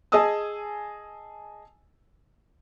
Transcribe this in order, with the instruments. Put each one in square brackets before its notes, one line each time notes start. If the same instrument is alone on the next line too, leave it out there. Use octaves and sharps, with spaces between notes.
[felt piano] G#4 D#5 G#5 A5 D#6 E6